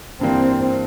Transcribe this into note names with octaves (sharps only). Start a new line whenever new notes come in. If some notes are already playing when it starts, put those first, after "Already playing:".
G2 E3 G3 A#3 C4